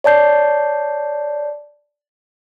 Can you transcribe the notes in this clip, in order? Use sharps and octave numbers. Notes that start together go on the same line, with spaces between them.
C#5 D5 A5 G6 C7